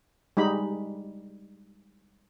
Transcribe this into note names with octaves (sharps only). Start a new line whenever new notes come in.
G3 G#3 D#4 B5